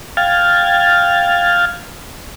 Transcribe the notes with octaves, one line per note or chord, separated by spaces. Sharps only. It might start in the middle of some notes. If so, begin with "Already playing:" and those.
F5 G5 F6 G#6 A6